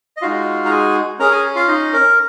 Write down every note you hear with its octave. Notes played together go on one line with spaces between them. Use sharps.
D#5
G#3 D#4 F4 F#4 F5
A#5
G#4 G#5
C#4 G#4 A#4 A#5
G#4 G#5
F4 F5
D#4 D#5
A#4